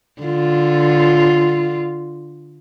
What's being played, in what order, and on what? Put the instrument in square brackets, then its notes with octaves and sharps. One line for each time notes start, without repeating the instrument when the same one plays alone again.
[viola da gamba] D3 F4